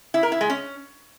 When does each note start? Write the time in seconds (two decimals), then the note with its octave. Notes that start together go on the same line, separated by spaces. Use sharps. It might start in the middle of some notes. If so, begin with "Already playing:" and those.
0.14 E4
0.23 A#4
0.32 E4
0.41 G#3
0.50 C#4